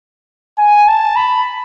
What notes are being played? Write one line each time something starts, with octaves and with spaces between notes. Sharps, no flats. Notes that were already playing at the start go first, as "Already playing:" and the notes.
G#5
A5
B5